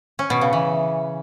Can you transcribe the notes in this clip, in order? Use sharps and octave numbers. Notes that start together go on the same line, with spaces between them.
C#4
B2
C#3
E3